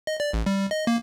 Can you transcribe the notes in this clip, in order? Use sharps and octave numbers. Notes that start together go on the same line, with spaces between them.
D#5
D5
A1
G3
D#5
A#3